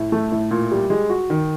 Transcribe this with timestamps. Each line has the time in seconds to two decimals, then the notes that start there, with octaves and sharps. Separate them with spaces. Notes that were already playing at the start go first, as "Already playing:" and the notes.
Already playing: A2
0.12 A3
0.32 A2
0.51 A#2
0.71 G3
0.90 G#3
1.10 F#4
1.30 D#3